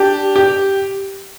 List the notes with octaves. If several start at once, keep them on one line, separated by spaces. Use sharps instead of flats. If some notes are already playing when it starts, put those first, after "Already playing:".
Already playing: D4 G4
G4